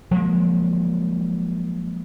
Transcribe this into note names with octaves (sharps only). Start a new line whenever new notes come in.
F3 F#3 G#3 A#3